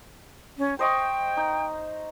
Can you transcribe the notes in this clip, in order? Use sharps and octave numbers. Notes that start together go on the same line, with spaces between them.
C#4
C5 D#5 G5 C#6
D#4